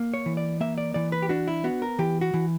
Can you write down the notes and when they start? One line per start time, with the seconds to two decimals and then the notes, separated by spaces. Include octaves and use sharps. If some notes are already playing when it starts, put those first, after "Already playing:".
Already playing: A#3
0.14 C#5
0.26 E3
0.37 D5
0.61 A#3 E5
0.78 D5
0.94 E3 D5
1.12 B4
1.22 G4
1.29 D4 F#4
1.48 E4
1.64 B3 F#4
1.82 A#4
1.99 E3 G4
2.21 F#4
2.34 E3